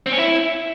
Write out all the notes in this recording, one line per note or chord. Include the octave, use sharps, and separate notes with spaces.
C4
C#4
E4